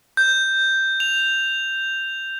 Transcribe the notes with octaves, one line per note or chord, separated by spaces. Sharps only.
G6
F7